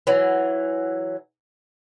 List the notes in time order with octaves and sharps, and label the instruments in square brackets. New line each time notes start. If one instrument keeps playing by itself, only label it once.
[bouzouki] E3 F#3